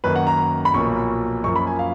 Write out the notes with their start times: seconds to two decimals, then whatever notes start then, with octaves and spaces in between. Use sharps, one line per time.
0.04 F#2 D#3 A#3 B4
0.16 F#5
0.27 A#5
0.65 B5
0.74 B1 A#2 F3 A#3 C#6
1.44 F#2 F3 A#3 C#6
1.56 B5
1.67 G#5
1.79 F5